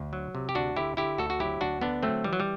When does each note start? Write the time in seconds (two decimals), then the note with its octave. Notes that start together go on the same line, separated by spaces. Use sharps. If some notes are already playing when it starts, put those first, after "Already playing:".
Already playing: D2
0.13 F#3
0.35 C3
0.49 G4
0.55 D2 D4 F#4
0.76 D3 E4 G4
0.97 D3 E4 G4
1.18 D2 F#4 A4
1.30 F#4
1.40 F#3 E4 G4
1.61 D2 D4 F#4
1.81 D3 B3 D4
2.03 F#3 A3 C4
2.24 E3 G3
2.33 F#3
2.40 G3